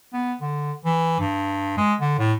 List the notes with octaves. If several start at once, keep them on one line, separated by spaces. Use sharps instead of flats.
B3
D3
E3
G2
G#3
D3
A2